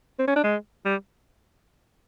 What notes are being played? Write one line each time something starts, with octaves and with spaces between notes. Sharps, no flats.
C4
C#4
D4
G#3
G3